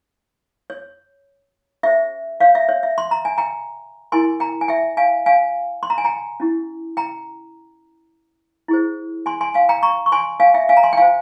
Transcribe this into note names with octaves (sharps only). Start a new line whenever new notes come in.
C#5
C#4 G4 C5 E5
C#5 F5
E5
C#5
E5
C6
A#5
G#5
G5 A#5
E4 G4 A#4 G#5 C6
G5 A#5
G#5
E5 G5
F5 G#5
F5 G#5
C6
A#5
G#5
G5 A#5
C#4 E4 G4
G5 A#5
E4 G#4 C5
G#5 C6
G#5 C6
F5 G#5
G5 A#5
A#5 C#6
C#6
G#5 C6
F5 G#5
E5 G5
F5 G#5
A#5
G#5 C6
G5
F4 C5 F5 G#5